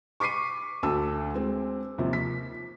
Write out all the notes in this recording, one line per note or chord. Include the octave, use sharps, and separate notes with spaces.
C#6 D6 B6 C7 D#7
D2 A5 E6
G#3 C4
D#2 C3 F3
B6